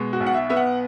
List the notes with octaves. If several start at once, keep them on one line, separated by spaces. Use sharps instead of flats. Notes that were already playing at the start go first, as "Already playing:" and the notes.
Already playing: B2 G#3
F#4
B1
F#5
E5
B3 E5
F#5